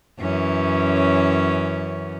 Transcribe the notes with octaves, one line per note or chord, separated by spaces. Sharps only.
F#2 E3 C#4